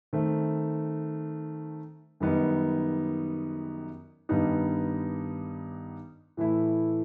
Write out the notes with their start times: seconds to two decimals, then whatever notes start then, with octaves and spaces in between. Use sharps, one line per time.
0.13 D#3 A3 C4
2.20 F#2 D#3 G3 B3 D#4
4.29 G2 D#3 G3 B3 D#4
6.37 A2 E3 A3 E4